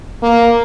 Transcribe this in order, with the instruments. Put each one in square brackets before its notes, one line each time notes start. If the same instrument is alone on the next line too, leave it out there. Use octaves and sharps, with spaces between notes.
[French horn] A#3